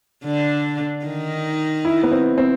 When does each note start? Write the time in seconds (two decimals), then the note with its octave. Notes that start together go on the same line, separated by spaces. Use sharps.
0.24 D3 D4
1.05 D#3 D#4
1.85 E4
2.03 B3
2.12 C4
2.38 C4